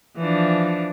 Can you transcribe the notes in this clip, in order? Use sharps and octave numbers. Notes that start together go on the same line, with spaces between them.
E3 F3 D4